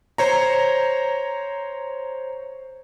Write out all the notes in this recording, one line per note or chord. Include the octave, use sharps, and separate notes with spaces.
C5 C#5 A#5